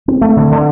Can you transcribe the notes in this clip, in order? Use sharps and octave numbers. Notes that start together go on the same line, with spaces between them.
C4
A3
D3
D3